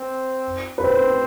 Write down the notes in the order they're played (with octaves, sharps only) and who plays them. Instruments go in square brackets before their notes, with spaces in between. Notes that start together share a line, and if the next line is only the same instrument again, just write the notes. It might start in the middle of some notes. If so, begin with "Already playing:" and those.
Already playing: [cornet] C4
[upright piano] B4
[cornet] C4 [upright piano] C5